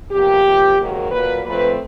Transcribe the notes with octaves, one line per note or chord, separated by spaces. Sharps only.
E2 C3 F3 A#3 G4
C3 F3 A#3
G#2 D#3 F#3 A#3
A#2 F#3 A#3 B4
A#2 F3 A3 C4 B4